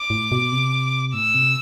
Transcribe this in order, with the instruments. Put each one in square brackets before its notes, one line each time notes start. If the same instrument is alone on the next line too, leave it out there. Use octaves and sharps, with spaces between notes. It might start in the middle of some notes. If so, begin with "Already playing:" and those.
Already playing: [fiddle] D6
[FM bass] A2
B2
C3
[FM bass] A2 [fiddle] E6
[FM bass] C3